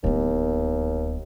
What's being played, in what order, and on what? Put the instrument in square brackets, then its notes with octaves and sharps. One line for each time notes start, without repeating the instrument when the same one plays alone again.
[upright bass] D1 B3 [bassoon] D#2